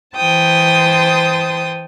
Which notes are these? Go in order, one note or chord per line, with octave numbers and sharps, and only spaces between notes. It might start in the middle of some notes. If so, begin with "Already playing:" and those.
E3 C5 G5 A5 D#6